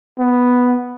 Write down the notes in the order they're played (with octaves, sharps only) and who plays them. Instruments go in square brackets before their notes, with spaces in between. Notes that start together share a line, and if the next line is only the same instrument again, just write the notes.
[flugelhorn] B3